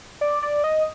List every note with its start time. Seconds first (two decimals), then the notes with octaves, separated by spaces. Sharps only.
0.21 D5
0.43 D5
0.64 D#5